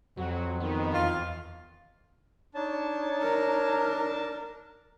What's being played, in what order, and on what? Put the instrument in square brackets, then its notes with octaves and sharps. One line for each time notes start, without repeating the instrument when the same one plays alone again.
[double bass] F2 [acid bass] F#3 [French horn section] F#4
[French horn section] G2 B2 D#3 [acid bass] B3
[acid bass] E2 [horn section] F4
[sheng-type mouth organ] D4 A5 [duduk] D#4 [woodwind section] C#5
[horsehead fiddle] A#4